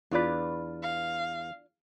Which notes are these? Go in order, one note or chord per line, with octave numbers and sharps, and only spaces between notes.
E2 D4 F4 B4 D5
F5